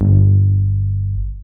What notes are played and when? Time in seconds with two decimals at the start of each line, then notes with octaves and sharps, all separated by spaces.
0.01 G1